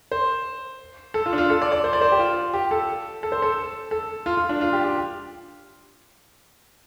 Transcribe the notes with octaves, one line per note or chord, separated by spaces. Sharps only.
C5
A4
F4
D4
F4
A4
D5
D5
C5
D5
C5
G4
F4
G4
A4
A4
C5
A4
A4
F4
F4
D4
F4
G4
G4